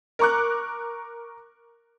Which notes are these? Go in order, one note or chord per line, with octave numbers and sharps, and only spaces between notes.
A#4 A#5 C#6 D6 F#6